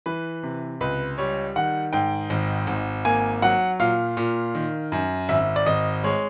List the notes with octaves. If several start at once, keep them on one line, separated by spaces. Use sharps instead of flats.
E3 B4
C3
C#2 B4
G3 C#5
D#3 F#5
G#2 G5
G#1
G#1
A#3 G#5
F#3 F#5
A#2 F5
A#2
D#3
F#2
G#1 E5
D5
G#1 D#5
G#3 C#5